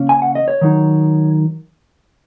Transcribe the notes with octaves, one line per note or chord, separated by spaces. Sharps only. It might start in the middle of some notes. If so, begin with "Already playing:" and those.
Already playing: C#3 A#3 C#4
G#5
F#5
D#5
C#5
D#3 F#3 D#4